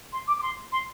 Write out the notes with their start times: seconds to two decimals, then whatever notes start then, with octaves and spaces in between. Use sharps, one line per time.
0.12 C6
0.27 D6
0.37 D6
0.42 C6
0.72 C6